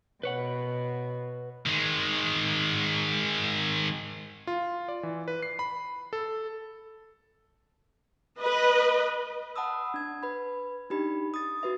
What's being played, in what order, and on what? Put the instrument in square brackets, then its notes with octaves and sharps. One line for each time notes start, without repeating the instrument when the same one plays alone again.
[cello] B2 [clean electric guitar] B4 C#5 F#5
[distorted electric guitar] D#3 G#3
[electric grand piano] F4
D5
E3
B4
C7
B5
A4
[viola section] B4 D#5
[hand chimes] F#5 A5 B5 D#6 E6
D4 G#6
B4 B5
D4 D#4 G4 B5
D#6 A6
F#4 B4 E5